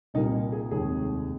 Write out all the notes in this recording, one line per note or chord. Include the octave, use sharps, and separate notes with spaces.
C2 A#2 G3 A#3 D#4
G#4
F1 D#2 D#3 G#3 G#4